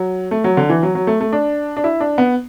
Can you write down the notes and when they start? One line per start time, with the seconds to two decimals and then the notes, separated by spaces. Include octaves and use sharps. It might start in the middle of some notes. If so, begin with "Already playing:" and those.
Already playing: F#3
0.31 A3
0.44 F#3
0.57 D3
0.70 E3
0.83 F#3
0.95 F#3
1.07 A3
1.21 A3
1.33 D4
1.77 D4
1.84 E4
2.00 D4
2.18 B3